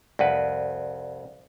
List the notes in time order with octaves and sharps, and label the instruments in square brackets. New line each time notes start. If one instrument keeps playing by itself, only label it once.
[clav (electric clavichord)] C2 F2 B4 [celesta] D5 F#5